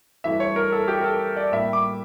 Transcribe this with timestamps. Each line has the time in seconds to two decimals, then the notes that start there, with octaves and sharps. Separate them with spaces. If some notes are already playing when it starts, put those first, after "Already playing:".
0.24 G2 E3 A3 E5
0.40 C#5
0.56 A#4
0.72 A4
0.88 G4
1.00 A#4
1.04 A4
1.36 D5
1.52 A2 G3 A#3 E5
1.73 D6